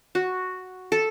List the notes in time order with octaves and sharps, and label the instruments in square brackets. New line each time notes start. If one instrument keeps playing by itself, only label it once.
[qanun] F#4
A4